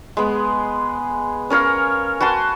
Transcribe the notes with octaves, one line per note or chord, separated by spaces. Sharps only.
G#3 B3
C#4 A#4 C#5 F5
F#4 B4 A5 C6